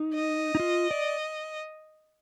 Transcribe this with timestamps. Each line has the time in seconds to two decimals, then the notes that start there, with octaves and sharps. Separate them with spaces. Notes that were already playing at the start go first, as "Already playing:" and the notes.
Already playing: D#4
0.14 D#5
0.55 D#4
0.60 F4
0.91 D5